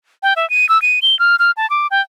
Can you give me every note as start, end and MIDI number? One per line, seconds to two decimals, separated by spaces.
0.23 0.34 79
0.36 0.48 76
0.50 0.68 99
0.69 0.81 88
0.82 0.99 99
1.02 1.18 103
1.19 1.36 89
1.39 1.51 89
1.57 1.69 81
1.70 1.87 86
1.91 2.01 79